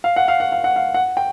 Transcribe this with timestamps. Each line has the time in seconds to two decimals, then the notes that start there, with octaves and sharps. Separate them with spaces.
0.04 F5
0.16 F#5
0.28 F5
0.40 F#5
0.52 F5
0.64 F#5
0.76 F5
0.94 F#5
1.17 G5